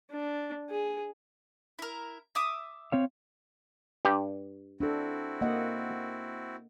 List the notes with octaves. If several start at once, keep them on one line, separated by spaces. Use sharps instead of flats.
D4
G#4
E4 A#4
E5 D6 D#6
C4 C#5 F5
G2 G4
C4 D4 E4 F#4 A4
A#3 D#5 F#5